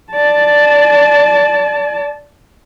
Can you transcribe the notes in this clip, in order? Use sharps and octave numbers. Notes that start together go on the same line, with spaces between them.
D5 A5